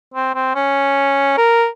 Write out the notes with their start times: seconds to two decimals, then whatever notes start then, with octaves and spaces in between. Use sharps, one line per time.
0.14 C4
0.35 C4
0.55 C#4
1.37 A#4